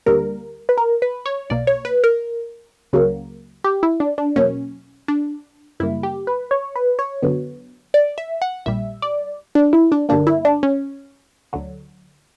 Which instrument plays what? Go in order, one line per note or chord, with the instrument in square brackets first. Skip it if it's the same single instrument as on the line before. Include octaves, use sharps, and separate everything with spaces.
[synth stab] D2 D3 G3 A#3 A#4
B4
A#4
B4
C#5
B1 B2 A#3 D5
C#5
B4
A#4
C#2 C#3 F#3 A#3
G4
E4
D4
D4
E2 B2 F#3 A#3 C#4
D4
F#2 C#3 G3 A#3 E4
G4
B4
C#5
B4
C#5
F#2 D3 F#3 B3
D5
E5
F#5
A#1 A#2 G3 E5
D5
D4
E4
D4
G1 G2 D3 A#3 D4
E4
D4
C#4
D2 D3 F#3